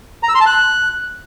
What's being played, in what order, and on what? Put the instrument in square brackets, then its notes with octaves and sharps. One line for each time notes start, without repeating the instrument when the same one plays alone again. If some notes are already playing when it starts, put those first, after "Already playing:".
[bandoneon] A#5
E6
C6
A5
F#6